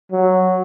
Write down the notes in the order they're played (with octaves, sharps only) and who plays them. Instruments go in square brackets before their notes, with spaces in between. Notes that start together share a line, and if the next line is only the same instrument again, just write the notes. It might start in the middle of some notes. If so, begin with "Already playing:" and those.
[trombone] F#3